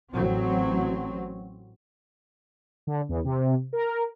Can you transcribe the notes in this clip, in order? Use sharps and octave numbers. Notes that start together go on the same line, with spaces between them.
A1 F#3 C4
D3
E2
C3
A#4